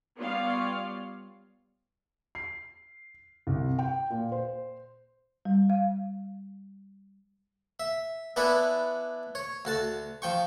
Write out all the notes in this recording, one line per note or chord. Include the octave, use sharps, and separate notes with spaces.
G3 B3 F4 C#5 D5 F5
C7
C2
G5
A#2
C5
G3
F5
E5
B3 D4 E4 B4 F#5 G#5
C#5
D2 F#4 A5
F3 G5 C#6